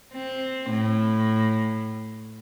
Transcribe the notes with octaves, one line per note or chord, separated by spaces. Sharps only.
C4
A2